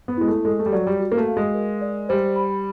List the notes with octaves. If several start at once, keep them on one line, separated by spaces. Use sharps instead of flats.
B3
G#3 E4
A3
G#3 A4
A3
G3
F#3 D5
G3
F#4
A#3
A3
F5
G#3
A#4
D5
G3 C5
B5